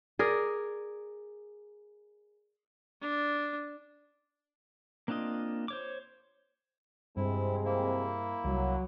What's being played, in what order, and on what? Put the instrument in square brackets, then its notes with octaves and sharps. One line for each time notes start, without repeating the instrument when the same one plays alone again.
[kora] G#4 A#4 D5
[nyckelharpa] D4
[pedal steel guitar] A#3 C4 D4 F4 D#5
C5 C#5 D6
[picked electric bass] G2 [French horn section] C3 G#3 C4 [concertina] E4
[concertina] A#3 E4
[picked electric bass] C2 G3 [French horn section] F#3